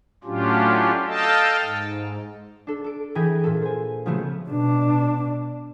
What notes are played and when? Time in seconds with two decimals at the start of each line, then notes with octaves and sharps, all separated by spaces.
0.24 A2 F#3 C#4 D4 F4 G4
1.07 A4 D#5 F5 G5 A5
1.62 G#2
2.67 D4 A4
2.84 A4 D7
3.15 E3 G#4 G5 B5 G#6 A#6
3.44 A#2 A4
3.62 C5 G#5
4.06 C#3 F3 F#3 A3 B3
4.50 B2 D4